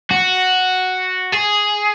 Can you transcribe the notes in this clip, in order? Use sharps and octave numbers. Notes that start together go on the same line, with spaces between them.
F#4
G#4